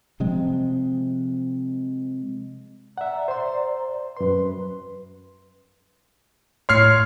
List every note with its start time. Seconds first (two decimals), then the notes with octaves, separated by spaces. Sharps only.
0.20 C3 F3 G#3 C4
2.98 D5 E5 F#5 A#5
3.28 C5 C6
4.17 F#2 B4 C6
6.69 A2 C#5 C6 F6 C7